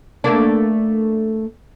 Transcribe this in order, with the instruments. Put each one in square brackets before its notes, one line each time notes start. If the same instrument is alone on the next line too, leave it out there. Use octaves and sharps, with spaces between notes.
[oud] A3 A#3 D4